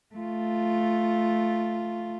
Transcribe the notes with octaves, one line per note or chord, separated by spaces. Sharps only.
A3 F4